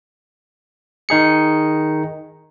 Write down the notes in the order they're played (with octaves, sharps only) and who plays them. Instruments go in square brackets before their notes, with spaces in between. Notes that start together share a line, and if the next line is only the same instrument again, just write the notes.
[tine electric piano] D#3 D#4 G#4 C#7